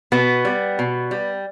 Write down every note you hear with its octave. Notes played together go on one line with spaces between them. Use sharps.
B2 B3
G3
B2
G3